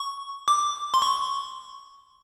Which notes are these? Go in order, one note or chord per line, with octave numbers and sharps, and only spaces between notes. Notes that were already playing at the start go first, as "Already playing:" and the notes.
Already playing: C#6
D6
C6
C#6